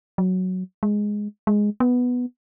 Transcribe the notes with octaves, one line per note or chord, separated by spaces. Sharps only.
F#3
G#3
G#3
B3